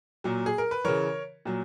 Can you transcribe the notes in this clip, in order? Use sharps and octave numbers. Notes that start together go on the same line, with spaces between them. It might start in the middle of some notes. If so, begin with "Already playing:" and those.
A#2 F#3
G#4
A#4
B4
C#3 E3 A#4 C#5
A#2 F#3